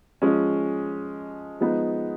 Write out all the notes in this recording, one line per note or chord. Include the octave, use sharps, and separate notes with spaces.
F3 G#3 C#4
F3 G#3 B3 D#4